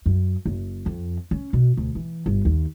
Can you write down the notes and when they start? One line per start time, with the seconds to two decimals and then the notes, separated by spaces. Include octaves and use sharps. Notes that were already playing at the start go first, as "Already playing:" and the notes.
0.06 F#2
0.46 F#1
0.86 F2
1.31 C#4
1.53 B2
1.77 D2
1.95 E3
2.26 G1
2.45 D#2